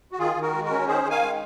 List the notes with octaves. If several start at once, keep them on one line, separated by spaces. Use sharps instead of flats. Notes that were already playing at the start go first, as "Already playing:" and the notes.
F#4
D#3 F4 G#4
D#3
F#4 A#4
G#3
F#4 A#4
C#4
D#3 G#4 C5
D#3
F5 G#5
G#3